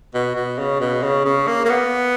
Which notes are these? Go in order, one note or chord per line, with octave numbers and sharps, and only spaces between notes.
B2
B2
C#3
B2
C#3
C#3
A#3
A#3
B3